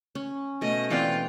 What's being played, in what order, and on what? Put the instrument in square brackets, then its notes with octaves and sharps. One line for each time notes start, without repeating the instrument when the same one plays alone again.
[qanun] C#4
[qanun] B2 A3 [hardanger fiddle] D#5
[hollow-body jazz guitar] E3 C4 D5 [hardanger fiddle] F4 [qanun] F#5 G5